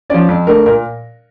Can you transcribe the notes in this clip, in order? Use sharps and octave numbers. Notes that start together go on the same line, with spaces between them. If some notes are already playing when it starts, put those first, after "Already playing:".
F3 C#4 D5
F2
D3 A3 D4 A#4
A#2 A#4